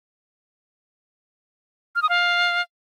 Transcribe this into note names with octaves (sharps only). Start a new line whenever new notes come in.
F6
D#6
F5